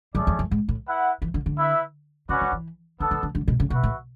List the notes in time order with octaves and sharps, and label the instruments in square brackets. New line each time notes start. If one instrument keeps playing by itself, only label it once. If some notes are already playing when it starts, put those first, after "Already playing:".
[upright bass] F#2 [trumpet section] A3 C#4 G#4 D5
[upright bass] E2
F#2
G#2
A2
[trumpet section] E4 B4 F#5
[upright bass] E3
D3
D3
[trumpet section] E4 B4 E5
[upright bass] C#3 [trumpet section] C#4 F#4 B4 D5 F#5
[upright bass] D3
E3
[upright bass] D3 [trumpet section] B3 D4 A4
[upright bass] D3
D3
D3
B2
C#3
[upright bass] B2 [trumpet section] F#4 B4 E5
[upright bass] A2